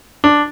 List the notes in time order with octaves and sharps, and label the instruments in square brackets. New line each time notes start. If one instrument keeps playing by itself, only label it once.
[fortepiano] D4